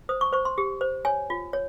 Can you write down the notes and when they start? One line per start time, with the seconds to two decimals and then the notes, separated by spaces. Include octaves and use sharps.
0.09 C5 D#6
0.21 C#6
0.33 C5 C#6
0.45 C6
0.58 G4
0.81 C5
1.05 C#5 G#5
1.30 F4
1.53 C#5